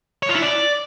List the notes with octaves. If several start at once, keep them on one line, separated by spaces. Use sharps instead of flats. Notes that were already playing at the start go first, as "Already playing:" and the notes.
C#5
F4
E4
D5